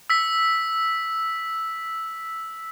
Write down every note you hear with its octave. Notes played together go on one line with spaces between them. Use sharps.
E6 B6